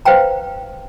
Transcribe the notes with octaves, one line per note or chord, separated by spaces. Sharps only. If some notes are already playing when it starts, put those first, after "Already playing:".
B4 C5 F5 G5 A#5